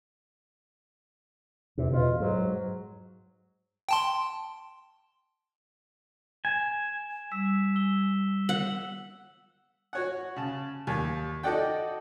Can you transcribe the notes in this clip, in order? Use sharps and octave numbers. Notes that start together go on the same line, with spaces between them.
E2 C3
B2 F4
G#2 F#3
G5 A5 C6
G#5 E7
G3 E6 B6 E7
E6 G7
F#5
F#4 C#5 F#5
C#3 A5
D#2
D#4 F#4 A4 D5 F#5 G5